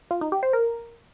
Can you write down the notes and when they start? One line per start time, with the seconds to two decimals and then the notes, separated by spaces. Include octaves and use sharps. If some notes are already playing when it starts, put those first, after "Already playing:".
0.11 F4
0.21 D#4
0.32 G4
0.43 C5
0.53 A#4